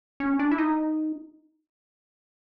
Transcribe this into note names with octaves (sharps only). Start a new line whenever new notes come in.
C#4
D4
E4
D#4